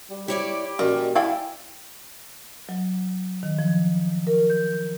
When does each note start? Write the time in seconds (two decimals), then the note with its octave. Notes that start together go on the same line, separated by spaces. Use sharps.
0.10 G3
0.28 E4 G4 C#5 D5
0.79 F#2 A#2 D#3 G3 A#4
1.15 E4 D5 F5 G5 G#5
2.69 F#3
3.43 D#3
3.59 F3
4.27 A#4
4.50 G6